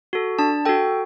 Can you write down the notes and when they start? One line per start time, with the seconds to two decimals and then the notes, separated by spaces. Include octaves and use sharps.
0.13 F#4 A4
0.39 D4 A5
0.65 F#4 A4 G5